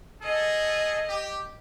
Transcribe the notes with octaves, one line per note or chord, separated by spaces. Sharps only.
G#4 A4 D#5
G4